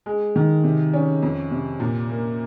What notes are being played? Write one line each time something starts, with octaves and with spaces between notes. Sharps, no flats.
G#3
D#3
C3
C#4
F2
C3
A#2
A#3